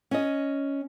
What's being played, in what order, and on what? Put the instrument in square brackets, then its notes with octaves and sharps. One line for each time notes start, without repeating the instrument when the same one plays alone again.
[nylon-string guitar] C#4 D#5